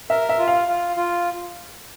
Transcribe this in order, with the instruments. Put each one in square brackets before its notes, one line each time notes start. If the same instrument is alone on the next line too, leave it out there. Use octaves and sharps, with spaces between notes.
[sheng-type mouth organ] A#4 [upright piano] E5
[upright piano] E5
[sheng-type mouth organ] F4
[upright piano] F5
[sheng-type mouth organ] F4
F4